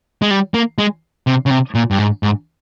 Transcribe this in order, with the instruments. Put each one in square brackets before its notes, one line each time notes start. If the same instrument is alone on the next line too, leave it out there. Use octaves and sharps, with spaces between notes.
[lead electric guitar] G#3
G3
A#3
G#3
C3
C#3
C3
A#2
G2
G#2
G#2